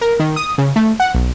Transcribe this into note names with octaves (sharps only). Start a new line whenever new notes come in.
A#4
D#3
D#6
C#3
A3
F#5
B1